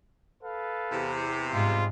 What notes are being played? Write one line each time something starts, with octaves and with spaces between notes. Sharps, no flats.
A4 B4 F5
E2 C3
G#2 G3 G#3 F4